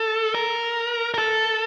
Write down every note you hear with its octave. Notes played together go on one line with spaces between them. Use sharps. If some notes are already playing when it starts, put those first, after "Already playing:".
Already playing: A4
A#4
A#4
A4